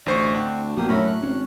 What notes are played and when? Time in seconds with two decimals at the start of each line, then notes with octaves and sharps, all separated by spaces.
0.06 A1 D2 C5 D5 C#6
0.35 C4 D4 F#4
0.77 A#1 B2 A#3 G4 D#6
0.88 F#2 A2 A#4 C#5 E5 B5
1.06 F#6
1.22 G#1 C#4